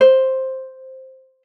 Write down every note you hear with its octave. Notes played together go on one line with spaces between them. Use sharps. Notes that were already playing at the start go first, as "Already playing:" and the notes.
C5